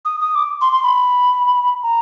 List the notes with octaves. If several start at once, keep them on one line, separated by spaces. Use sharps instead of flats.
D#6
D#6
D6
C6
C6
B5
A#5